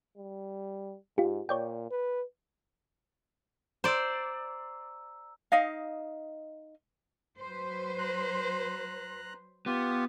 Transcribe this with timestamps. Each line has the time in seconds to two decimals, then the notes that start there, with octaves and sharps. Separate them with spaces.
0.18 G3
1.18 G#2 F4 G4
1.49 A#2 C#5 D5 G5
1.91 B4
3.84 C5 D5 A#5 E6
5.52 D#4 D#5 F5
7.39 F#3 B4 C5
7.99 A#5 F#6
9.66 B3 F4 G4